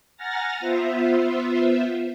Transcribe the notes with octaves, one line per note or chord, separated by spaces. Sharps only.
F#5 G#5 A#5 F6 A6 A#6
B3 F4 C5 E5